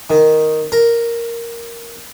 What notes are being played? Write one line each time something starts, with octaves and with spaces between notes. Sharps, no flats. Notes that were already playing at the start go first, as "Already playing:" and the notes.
D#3
A#4